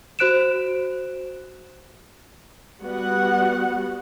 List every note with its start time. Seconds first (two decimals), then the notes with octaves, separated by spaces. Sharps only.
0.19 F#4 C5 F#6 D7 E7
2.83 G3 B3 F#4 F#5